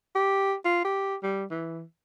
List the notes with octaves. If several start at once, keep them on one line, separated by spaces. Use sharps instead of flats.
G4
F4
G4
G3
E3